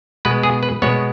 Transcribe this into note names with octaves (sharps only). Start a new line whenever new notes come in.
B2 G#3 B3 B4
G#4
B4
B2 G#3 B3 C#5